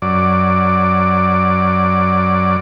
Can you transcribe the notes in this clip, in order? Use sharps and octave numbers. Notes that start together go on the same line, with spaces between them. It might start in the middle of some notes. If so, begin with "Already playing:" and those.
F#2 D5